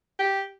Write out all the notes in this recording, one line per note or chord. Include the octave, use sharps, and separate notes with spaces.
G4